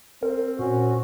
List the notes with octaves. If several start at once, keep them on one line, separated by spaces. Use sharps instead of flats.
C4 A#4
A#2 C#4 F#4